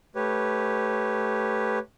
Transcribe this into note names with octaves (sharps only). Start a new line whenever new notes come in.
A3 G4 B4 C#5